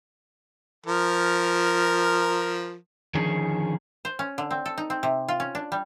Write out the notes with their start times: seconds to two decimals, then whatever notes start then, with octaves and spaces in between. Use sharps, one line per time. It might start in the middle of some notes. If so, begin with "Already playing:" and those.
0.86 F3 A#4
3.14 D3 D#3 F3 C#4 G#4
4.05 C5
4.19 C#4
4.38 D3
4.51 C4
4.65 A4
4.78 D#4
4.90 C4
5.03 C3
5.28 F4
5.40 C#4
5.55 D4
5.72 G3